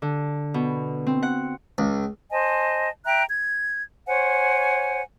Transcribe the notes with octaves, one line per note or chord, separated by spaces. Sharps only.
D3
B2
C4
F#5
C#2
C5 D#5 G#5 A5
E5 G5 A#5 F#6
G#6
C5 C#5 F#5 G#5